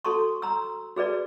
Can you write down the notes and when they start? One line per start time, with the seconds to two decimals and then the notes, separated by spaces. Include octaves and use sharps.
0.05 F#4 A4 A5 C6 C#6
0.42 A#5 C6 E6
0.96 F#4 G#4 B4 D5